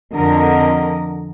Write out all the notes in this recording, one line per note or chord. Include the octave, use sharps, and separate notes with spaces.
F2 D3 A#4 D#5